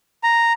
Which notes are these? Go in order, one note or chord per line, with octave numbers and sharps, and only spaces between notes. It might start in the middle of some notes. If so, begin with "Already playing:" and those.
A#5